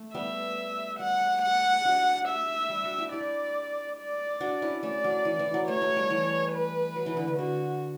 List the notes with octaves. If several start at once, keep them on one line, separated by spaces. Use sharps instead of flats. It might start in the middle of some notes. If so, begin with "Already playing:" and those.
Already playing: A3
G3 B3 E5
G3 F#5
F#5
D4 F#4
E5
G3
D4 F#4
E4 G4
E4 G4 D5
D5
D4 F#4
C#4 E4
A3 C#4 D5
F#3
E3
E3
F#3
A3 C#5
A3
G3
E3
B4
F#3
E3
D3
D3
D3 F#4